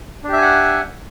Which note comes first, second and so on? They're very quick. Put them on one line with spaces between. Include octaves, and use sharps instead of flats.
D4 G4 E5 G#5 F#5